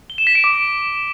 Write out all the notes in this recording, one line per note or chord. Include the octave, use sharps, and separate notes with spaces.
G7
E7
B6
D7
D6